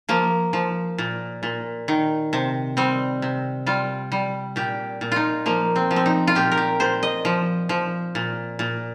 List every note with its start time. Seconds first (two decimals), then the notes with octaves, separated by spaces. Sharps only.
0.09 F3 A#3
0.53 F3
0.98 A#2
1.43 A#2
1.88 D#3
2.33 C3
2.77 G3 C4
3.22 C3
3.66 G3 F4
4.12 G3
4.56 A#2 G4
5.01 A#2
5.12 D#4 F4
5.46 F3 A#3
5.76 C4
5.91 F3
5.96 C4
6.06 D#4
6.27 F4
6.35 A#2 G4
6.52 A#4
6.57 G4
6.80 A#2 C5
7.03 D#5
7.25 F3
7.69 F3
8.15 A#2
8.59 A#2